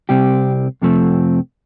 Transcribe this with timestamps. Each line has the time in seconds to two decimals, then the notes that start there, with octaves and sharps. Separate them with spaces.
0.09 C2 C3 G3 C4 G4
0.82 F2 C3 F3 A3 C4